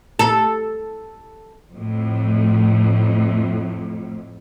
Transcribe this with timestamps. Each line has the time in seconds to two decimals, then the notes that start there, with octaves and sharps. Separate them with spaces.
0.19 A4
1.74 F2 A2